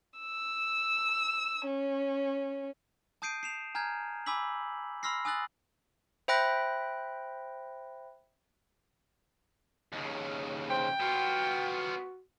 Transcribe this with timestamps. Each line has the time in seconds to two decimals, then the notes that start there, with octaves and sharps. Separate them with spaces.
0.20 E6
1.66 C#4
3.22 A5 D#6 G6 C7 D7 D#7
3.43 C7 E7 F7
3.75 G#5 A#5 F6 G6 G#6
4.26 G#5 B5 D6 E6 B6 F#7
5.03 B5 C6 E6 F6 A#6 C7
5.25 G#5 D#6 E6 F#6 A6 F#7
6.28 C5 E5 G5 B5 F#6 A#6
9.93 D#2 C#3
10.70 C5 G5
11.00 B3 F4 F#4